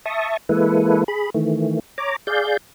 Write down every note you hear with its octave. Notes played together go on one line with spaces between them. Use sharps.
E5 A5 C#6 D#6
E3 G#3 A#3 E4 A4 B4
G#4 B5
D#3 E3 A3
C#5 A#5 D6
G#4 D5 F5 G6